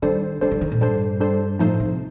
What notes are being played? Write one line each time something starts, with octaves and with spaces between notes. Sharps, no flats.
D#3 G3 D4 A4 C5
D#3 G3 D4 A4 C5
D3
D#3
A#2
G2 G3 D4 A4 C5
G3 D4 A4 C5
A2 F3 A3 D#4 A4 C5
C3